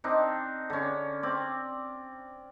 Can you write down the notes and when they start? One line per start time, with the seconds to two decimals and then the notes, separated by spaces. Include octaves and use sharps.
0.04 C4 D4 D#4
0.70 D3 C#4
1.23 C4 D5